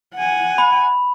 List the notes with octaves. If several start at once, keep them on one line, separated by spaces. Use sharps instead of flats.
F#5 G#5
B5